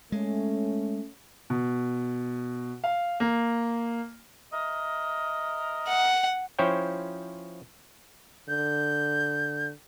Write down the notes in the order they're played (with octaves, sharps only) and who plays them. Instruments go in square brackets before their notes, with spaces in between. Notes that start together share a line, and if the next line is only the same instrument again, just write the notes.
[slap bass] G#3 [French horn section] A3 C#4
[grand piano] B2
F5
A#3
[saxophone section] A#4 D#5 E5
[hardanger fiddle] F#5
[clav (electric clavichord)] F3 C#4 E4 C5 C#5 G5
[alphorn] D3 [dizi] G6